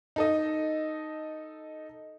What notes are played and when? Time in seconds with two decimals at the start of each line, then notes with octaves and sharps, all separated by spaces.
0.16 D#4 A4 D#5